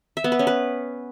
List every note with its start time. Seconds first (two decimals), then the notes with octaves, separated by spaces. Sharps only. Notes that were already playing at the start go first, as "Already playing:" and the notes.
0.17 E5
0.24 B3
0.32 B4
0.39 C#4
0.47 B4